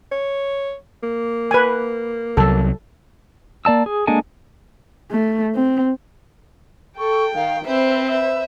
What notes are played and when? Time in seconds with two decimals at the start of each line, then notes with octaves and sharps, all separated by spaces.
0.12 C#5
1.03 A#3
1.51 B4 G#5
2.37 C2 F#3 A4
3.65 A#3 D5 A5 E6
3.86 G#4
4.07 G#3 A#3 D4 A4 G#5
5.11 A3
5.56 C4
6.98 A4 G5 C#6
7.35 D#3 F5
7.67 C4 B4 C5 E5
8.07 E5